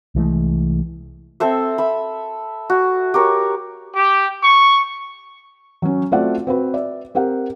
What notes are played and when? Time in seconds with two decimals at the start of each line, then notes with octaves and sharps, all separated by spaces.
0.15 C2 E3 G#3 A3
1.40 C4 A4 C5 E5
1.78 E5 B5
2.70 F#4
3.14 G4 A#4 C#5
3.95 G4
4.44 C#6
5.82 F#3 C#4
6.12 A3 C4 F4 F#4 D5 F#5
6.47 C4 F#4 B4
6.74 D5 E5
7.15 C4 G4 A#4 F#5